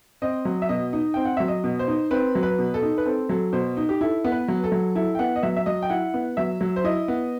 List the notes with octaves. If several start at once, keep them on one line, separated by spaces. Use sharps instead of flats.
C4 D#5
F#3
E5
B2 D#5
D#4
C4 G5
F#5
F#3 E5
D#5
B2
C5
D#4
C4 B4
F#3
B4
B2
A4
D#4
B4
C4 A4
F#3 A4
B2 C5
D#4
G4
E4 A4
B3
B4
F#3
A4
F#3
E4 A4
G5
B3 F#5
D#5
F#3 E5
E5
F#3 D#5
G5
E4 F#5
B3
F#3 E5
F#3
C5
E4 D#5
B3